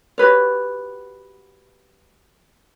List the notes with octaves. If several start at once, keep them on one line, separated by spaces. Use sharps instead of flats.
F#4 G4 B4 C#5